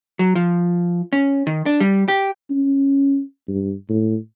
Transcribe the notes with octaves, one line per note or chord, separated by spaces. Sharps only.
F#3
F3
C#4
D#3
D4
G3
G4
C#4
G2
A2